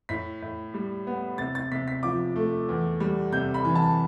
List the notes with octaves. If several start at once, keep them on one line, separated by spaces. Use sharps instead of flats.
A2 B6
A2
G3
B3
C3 A6
A6
C3 B6
B6
F3 D6
A3
E2
G3
C3 G6
B5
E3
A5